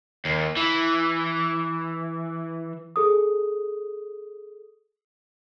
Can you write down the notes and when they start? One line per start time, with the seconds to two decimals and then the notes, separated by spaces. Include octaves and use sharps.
0.25 D#2
0.57 E3
2.96 G#4 A4 D#6